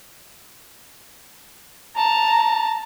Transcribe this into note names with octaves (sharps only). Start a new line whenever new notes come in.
A5 A#5